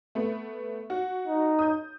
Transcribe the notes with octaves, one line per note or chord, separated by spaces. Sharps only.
A3 B3
F#4
D#4
D#6 G6